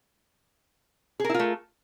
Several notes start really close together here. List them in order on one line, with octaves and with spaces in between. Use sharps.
G#4 A#4 E4 F4 A3